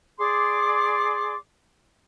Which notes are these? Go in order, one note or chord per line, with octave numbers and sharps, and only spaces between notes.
G#4 D5 C6 D6